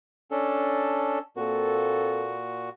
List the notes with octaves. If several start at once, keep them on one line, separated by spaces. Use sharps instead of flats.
C#4 D4 A4
A#2 A#3 C4 F#4 A4